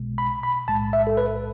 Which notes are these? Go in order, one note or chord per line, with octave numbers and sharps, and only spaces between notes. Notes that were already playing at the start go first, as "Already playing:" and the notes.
Already playing: B1 B2 G#3
B5
B5
B1 A2 G#3 A5
E5
A4
B4